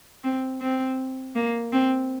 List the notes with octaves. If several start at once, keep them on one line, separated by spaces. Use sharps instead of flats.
C4
C4
A#3
C4